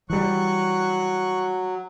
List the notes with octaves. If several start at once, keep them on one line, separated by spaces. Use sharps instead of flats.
E3 F#3 G3 C#6 F#6